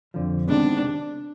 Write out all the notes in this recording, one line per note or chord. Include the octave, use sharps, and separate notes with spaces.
F2 D3 F3
C3 D#3 G#3 B3 D4